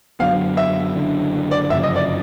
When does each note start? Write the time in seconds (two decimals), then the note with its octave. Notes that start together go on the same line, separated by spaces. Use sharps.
0.20 F#2 D3 F#3 B3 F5
0.57 E5
0.96 F#1 F#2 D3
1.51 D5
1.70 G1 F#2 C#3 F3 E5
1.83 D#5
1.96 D5